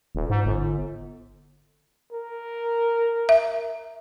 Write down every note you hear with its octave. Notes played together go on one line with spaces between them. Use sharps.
D#1
G#2
G1
A#4
E5